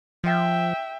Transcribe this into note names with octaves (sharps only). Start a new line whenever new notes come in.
F3 E5 G5